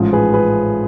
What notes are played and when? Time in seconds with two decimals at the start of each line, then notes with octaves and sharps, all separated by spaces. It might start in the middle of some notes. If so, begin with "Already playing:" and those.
Already playing: A1 G#2 F3
0.13 G#4 B4
0.34 G#4 B4